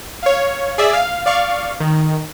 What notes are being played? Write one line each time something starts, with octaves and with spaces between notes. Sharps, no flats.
C#5 F5
G#4 D5 E5
F5
D5 F5 C#6
D#3